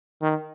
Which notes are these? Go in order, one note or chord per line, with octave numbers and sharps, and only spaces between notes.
D#3